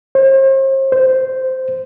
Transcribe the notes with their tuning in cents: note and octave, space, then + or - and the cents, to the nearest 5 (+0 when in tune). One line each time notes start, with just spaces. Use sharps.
C5 +40
C5 -10